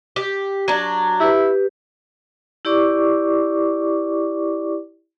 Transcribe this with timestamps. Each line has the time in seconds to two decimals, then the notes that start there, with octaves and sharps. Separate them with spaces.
0.16 G4
0.68 F#3 D4
1.20 E4 G4 B4
2.65 E4 G4 D5 C#6 D6